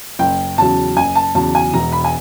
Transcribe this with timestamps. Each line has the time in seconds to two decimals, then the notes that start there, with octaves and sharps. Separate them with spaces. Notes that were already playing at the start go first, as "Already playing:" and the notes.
0.19 F#1 G5
0.58 E2 C#3 F#3 A5
0.96 F#1 G#5
1.15 A5
1.34 E2 C#3 F#3 A5
1.55 G#5
1.73 E1 A#5
1.92 B5
2.04 G#5